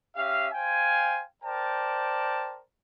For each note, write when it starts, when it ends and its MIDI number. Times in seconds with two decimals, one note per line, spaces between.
0.16 0.47 61
0.16 0.47 67
0.16 0.47 76
0.16 0.47 77
0.53 1.22 72
0.53 1.22 77
0.53 1.22 79
0.53 1.22 80
1.44 2.60 70
1.44 2.60 72
1.44 2.60 74
1.44 2.60 79
1.44 2.60 81